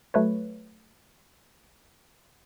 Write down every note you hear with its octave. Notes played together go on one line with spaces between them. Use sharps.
F#3 A3 B4 C#5